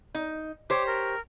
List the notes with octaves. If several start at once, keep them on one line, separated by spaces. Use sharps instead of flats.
D#4
G4 C5 C#5 D6
A#4